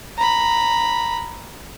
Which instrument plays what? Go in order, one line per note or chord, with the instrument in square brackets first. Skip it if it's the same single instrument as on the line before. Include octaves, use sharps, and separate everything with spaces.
[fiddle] A#5 B5